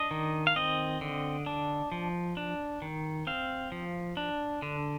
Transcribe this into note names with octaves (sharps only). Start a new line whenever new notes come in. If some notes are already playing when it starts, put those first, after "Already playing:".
Already playing: D4 D#5
D#3
F5
C4 D#5
D3
D4
F3
D4
D#3
C4 F5
F3
D4
D3